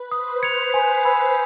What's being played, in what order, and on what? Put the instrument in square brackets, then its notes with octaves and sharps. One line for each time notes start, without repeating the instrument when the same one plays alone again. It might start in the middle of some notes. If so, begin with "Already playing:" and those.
Already playing: [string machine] B4
[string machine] C5 [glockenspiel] D#6
[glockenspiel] G#6 C#7 F7
G#5
B5 E6 G#6